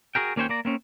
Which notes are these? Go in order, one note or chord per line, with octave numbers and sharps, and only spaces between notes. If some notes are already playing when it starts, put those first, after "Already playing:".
F#4 G#4 A#4 G5
D#2 A#3 C#4 C5 C#5 G5
A#3 D5 A#5
A#3 C4 C#4